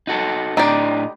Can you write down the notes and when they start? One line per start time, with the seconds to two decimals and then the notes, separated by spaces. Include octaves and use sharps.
0.07 D#4 F#4 A4
0.57 A2 D4 D#4 G4 D5 D#5